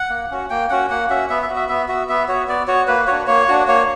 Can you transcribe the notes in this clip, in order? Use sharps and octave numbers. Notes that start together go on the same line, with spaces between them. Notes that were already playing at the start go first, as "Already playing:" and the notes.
Already playing: F#5
A#3
C#4 F#4
A#3 G5
C#4 F#4 F#5
A#3 F#5
C#4 F#4 E5
B3 E5
E5
F#4
E5
B3 E5
F#4 E5
B3 E5
F#4 C#5
B3 D5
F#4 C#5
A#3 B4
D4 F#4 C#5
A#3 C#5
D4 F#4
A#3 C#5